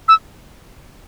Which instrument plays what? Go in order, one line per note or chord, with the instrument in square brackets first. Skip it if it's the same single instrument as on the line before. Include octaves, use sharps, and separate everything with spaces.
[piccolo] E6